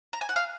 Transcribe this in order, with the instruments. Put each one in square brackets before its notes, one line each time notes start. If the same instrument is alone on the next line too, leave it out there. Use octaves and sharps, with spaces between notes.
[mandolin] A#5
G#5
F#5
F5